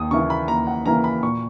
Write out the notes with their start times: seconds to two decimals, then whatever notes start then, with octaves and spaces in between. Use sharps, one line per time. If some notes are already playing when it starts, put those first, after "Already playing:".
Already playing: D#2 D#6
0.11 C#3 E3 A#3 E4 C#6
0.30 B5
0.48 D#2 A#5
0.67 F#5
0.85 C#3 E3 A#3 E4 A#5
1.04 B5
1.23 A#2 C#6